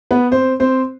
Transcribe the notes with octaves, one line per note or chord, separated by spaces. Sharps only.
B3 B4
C4 C5
C4 C5